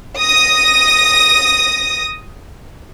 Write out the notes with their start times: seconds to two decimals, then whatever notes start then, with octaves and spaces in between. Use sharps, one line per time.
0.20 D#6 A#6